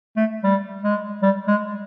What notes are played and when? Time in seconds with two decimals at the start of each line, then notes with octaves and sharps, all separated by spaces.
0.17 A3
0.44 G3
0.83 G#3
1.22 G3
1.48 G#3